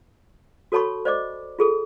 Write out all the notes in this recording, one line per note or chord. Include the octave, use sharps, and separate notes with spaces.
F#4 A4 C#5 A5 B5 C#6
C5 D5 D#5 D6
F4 G#4 A4